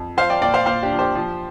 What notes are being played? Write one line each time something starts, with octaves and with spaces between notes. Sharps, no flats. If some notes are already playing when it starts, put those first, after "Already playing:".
Already playing: F2
F3 C5 F5
D5 G5
A#2 D5 G5
C5 F5
A#2 C5 F5
D4 G4
F3
G4 C5
F3